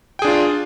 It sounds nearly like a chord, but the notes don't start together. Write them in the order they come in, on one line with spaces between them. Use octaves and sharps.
G5 G#4 D4 F4